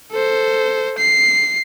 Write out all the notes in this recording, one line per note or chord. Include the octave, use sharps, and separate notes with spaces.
A4 C5
C7